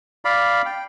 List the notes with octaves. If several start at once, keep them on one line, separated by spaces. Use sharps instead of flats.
D5 F5 B5
G5